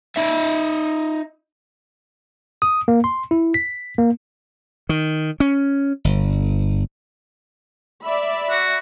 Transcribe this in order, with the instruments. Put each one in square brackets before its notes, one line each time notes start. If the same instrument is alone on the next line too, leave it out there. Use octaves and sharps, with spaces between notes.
[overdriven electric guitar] D#4 E5
[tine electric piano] D#6
A#3
C6
E4
B6
A#3
[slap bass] D#3
C#4
G1
[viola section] D5 E5 B5
[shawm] F#4